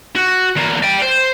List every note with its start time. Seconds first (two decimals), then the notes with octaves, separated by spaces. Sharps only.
0.16 F#4
0.56 E2 A#3
0.83 D5 G5
1.02 C5